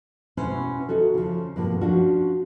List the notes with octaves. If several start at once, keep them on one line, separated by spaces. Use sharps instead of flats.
B2 C#4 E4 B4 C5
D#4 F#4 A4
C#3 F3
G2 B2 F3 A#3
F3 C#4 D4 F#4